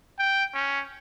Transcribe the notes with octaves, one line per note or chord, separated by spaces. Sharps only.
G5
C#4